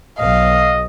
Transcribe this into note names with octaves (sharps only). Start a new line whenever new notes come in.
B1 D#5 F5